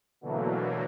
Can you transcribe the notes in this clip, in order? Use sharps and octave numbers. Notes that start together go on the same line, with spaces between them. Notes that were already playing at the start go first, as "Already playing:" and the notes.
B2 D3 E3 F#3 A3 A#3